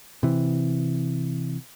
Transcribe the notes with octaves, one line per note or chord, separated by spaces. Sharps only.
C3 E3